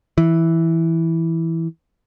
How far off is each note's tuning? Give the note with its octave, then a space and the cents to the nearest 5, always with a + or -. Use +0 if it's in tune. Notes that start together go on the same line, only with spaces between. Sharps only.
E3 -5